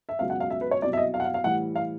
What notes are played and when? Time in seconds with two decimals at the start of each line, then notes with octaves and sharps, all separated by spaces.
0.09 E5
0.19 C#2 B2 F#3 F5
0.30 F#5
0.40 F5
0.50 E5
0.61 B4
0.71 C#5
0.82 C2 B2 F#3 D5
0.93 E5
0.97 D#5
1.14 F5
1.20 F#5
1.24 F5
1.34 F5
1.44 A2 E3 G3 F#5
1.76 F5